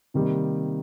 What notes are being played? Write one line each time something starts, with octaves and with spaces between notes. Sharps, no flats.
C3 D#3 G3 A#3